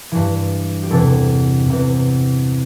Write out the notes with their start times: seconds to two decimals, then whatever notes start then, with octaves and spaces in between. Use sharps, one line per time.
0.12 G2 E3
0.83 G4
0.90 E2 C3 E3 A4
1.69 E2 C3 E3